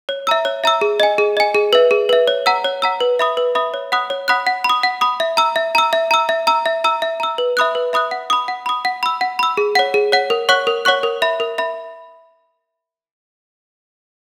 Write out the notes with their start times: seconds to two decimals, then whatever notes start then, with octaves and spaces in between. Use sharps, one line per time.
0.09 C#5
0.27 E5 A#5 E6
0.45 C#5
0.64 E5 A#5 E6
0.81 G#4
1.00 D#5 G#5
1.18 G#4
1.37 D#5 G#5
1.55 G#4
1.73 B4 E5
1.91 G#4
2.09 B4 E5
2.28 C#5
2.46 F#5 A#5 E6
2.64 C#5
2.82 F#5 A#5 E6
3.01 B4
3.19 E5 B5 D#6
3.37 B4
3.55 E5 B5 D#6
3.74 C#5
3.92 F#5 B5 D#6 F#6
4.10 C#5
4.28 F#5 B5 D#6 F#6
4.47 F#5
4.64 B5
4.69 D#6
4.83 F#5
5.01 B5 D#6
5.20 E5
5.37 A#5 E6
5.56 E5
5.75 A#5 E6
5.93 E5
6.11 A#5 E6
6.29 E5
6.47 A#5 E6
6.66 E5
6.84 A#5 E6
7.02 E5
7.20 A#5 E6
7.38 B4
7.57 E5 B5 D#6 F#6
7.75 B4
7.93 E5 B5 D#6 F#6
8.11 F#5
8.30 B5 D#6
8.48 F#5
8.66 B5 D#6
8.85 F#5
9.03 B5 E6
9.21 F#5
9.39 B5 E6
9.57 G#4
9.75 C#5 F#5
9.94 G#4
10.12 C#5 F#5
10.30 A#4
10.49 C#5 F#5 C#6 F#6
10.67 A#4
10.85 C#5 F#5 C#6 F#6
11.03 A#4
11.22 E5 B5
11.40 A#4
11.58 E5 B5